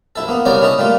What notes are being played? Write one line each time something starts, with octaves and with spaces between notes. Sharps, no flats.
A#1 E4 A4
A#3 B3
C2 C#3 B3 C#4 A#4 D5
C#4 E4 A4 D#5
A#2 G3 A3 A#3 F4